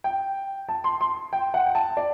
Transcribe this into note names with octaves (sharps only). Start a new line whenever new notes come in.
G5
A5
C6
C6
G5
F#5
G5
A5
D5